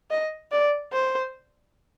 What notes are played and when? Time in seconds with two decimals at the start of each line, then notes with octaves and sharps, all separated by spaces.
0.11 D#5
0.51 D5
0.93 C5